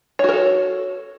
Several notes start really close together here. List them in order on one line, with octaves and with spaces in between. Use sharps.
C#5 F#4 A#4 A4